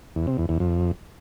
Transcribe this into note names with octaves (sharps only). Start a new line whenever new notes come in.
E2
C3
E2
E2
F2